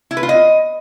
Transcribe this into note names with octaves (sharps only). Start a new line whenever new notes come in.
E4
B4
F4
D#5